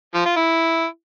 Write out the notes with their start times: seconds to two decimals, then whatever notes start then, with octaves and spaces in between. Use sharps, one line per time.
0.15 F3
0.26 F4
0.37 E4